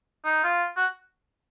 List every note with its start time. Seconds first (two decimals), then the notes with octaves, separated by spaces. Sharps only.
0.25 D#4
0.44 F4
0.76 F#4